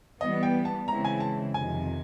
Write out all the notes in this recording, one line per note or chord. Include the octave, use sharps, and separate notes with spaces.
E3 G3 B3 D#5
G5
A5
C#3 E3 G#3 C4 E4 A#5
G#5
A5
F2 C3 D#3 G#5